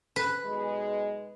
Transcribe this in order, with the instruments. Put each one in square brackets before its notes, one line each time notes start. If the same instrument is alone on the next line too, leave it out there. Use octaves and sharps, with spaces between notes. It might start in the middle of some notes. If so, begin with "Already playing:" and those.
[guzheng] B4
[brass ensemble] B1 G#3